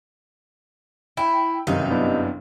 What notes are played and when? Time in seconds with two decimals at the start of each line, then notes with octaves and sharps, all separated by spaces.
1.17 E4 G5
1.67 G1 F#2 C3 D#3 D#4
1.91 B3 D4 E4